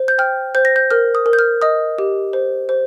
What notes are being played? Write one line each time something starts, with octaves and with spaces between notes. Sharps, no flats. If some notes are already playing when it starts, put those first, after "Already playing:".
Already playing: C5
G6
G5 F6
C5 G6
A#6
G6
A#4 F6
D#6
A#4
G6
F6
D#5 D#6
G4
C5
C5